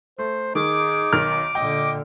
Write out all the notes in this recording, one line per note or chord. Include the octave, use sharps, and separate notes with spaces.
A3 C5
D#3 D#4 G#4 D6
B1 D#3 F6
A#2 D3 D#5 G5